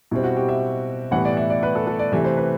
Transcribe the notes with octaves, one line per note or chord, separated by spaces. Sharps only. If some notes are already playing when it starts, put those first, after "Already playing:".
B2 G3 C4 E4
F#4
G4
E5
A2 E3 G3 B3 F#5
D5
E5
D5
B4
A4
A4
D5
C3 E3 A3 E5
C5
B4